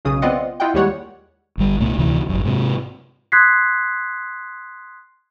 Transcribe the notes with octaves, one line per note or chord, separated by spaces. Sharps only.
B1 C#3 D#6
B3 C4 F4 D5 D#5 F#5
E4 F4 D#5 F#5 G5
D#2 G3 G#3 C#5 F#5
G1 G3
C2 A#2 A3 B3
D2 C3 E3
G#1 F#2
G#2 C3
C6 D#6 F#6 G#6 B6 C7